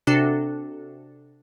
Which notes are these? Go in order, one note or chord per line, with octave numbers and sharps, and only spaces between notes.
C3 D4 F#4 A4